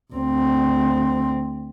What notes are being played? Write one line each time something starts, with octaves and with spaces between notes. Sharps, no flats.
D2 C4